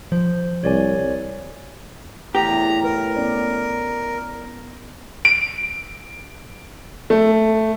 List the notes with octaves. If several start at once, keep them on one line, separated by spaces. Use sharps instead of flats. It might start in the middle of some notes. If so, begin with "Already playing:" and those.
F3 C5
C2 C#5 D5 G#5
E2 A2 E4 G4 B4 A#5
A#4 B4
B3 C#4 D5
D7
A3